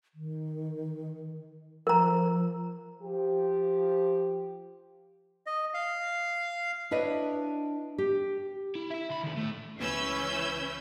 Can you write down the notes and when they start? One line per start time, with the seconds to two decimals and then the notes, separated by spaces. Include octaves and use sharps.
0.15 D#3
1.87 F3 A#4 A#5
3.02 F3 G4
5.47 D#5
5.74 F5
6.91 D4 E4 B4 C#5 D#5
7.98 G4
8.75 E4
8.90 E4 E5
9.10 D2 B5
9.24 D#3 A3
9.37 A3 E4
9.78 C#2 E3 C#4 B4 E6 G6